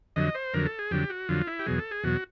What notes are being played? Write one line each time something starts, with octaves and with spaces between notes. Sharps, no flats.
F2 D3 F#3 D#5
C5
F2 D3 F#3 A#4
A4
G#4
F2 D3 F#3 G4
F#4
F2 D3 F#3 F4
E4
G4
E2 B2 F#3 G#4
A4
G#4
E2 B2 F#3 F#4